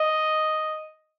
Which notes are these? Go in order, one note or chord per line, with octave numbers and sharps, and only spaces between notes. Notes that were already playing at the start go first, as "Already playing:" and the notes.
Already playing: D#5